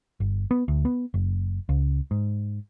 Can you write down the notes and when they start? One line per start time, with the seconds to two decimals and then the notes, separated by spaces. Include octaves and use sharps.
0.20 G1
0.51 B3
0.68 D2
0.85 B3
1.14 F#1
1.69 C#2
2.11 G#2